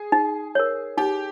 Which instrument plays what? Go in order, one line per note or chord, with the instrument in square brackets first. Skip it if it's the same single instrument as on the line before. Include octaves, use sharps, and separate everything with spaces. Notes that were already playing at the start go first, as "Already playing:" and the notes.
Already playing: [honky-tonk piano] G#4
[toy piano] D#4
A#4 C#5
[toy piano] D#4 [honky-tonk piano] G4